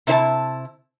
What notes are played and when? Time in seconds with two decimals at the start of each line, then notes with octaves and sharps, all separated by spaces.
0.07 C3 E4 C5 A5